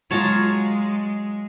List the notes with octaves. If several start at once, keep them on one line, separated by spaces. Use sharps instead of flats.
F#3 G#3 F4 C#5 A5 A#5